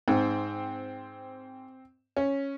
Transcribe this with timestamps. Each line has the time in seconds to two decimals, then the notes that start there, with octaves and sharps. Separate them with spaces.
0.08 G#2 C4
2.17 C#4